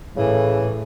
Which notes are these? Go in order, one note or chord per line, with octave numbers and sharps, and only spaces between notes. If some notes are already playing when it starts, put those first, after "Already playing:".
A2 C#3 E3